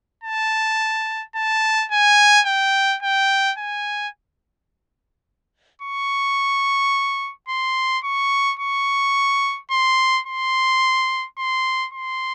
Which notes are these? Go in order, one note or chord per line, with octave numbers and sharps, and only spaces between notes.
A5
A5
G#5
G5
G5
G#5
C#6
C6
C#6
C#6
C6
C6
C6
C6